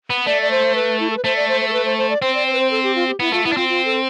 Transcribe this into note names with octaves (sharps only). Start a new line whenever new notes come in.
B3
A3 D5
D5
C5
B4
E4
A4
B4
A3 C5
D5
C5
C5
A4
B4
C5
C5
D5
C4 C5
D5
C5
B4
C5
A4
G4
F4
G4
B3 E4
A3 F4
B3 E4
D4
C4 F4
F4
A4